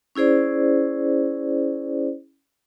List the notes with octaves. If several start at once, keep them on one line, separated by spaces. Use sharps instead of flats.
C#4 E4 G#4 C5 D5